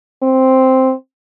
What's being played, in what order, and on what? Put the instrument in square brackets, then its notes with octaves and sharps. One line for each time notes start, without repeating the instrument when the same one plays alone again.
[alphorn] C4